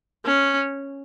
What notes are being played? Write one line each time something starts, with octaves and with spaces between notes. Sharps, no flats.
C#4